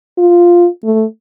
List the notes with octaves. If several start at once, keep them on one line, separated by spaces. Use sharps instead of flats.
F4
A3